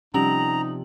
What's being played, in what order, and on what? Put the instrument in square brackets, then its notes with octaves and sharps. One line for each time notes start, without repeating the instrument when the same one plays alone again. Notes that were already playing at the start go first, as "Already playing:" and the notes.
[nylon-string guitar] C3 F3 G3 [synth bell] C#4 F#7 [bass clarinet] D#4 [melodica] A#5